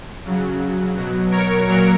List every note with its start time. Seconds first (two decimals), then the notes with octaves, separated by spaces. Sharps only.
0.25 C#3 F#3
0.96 B2 F#3
1.30 A#4 C#5
1.66 A#2 F#3 A#4 C#5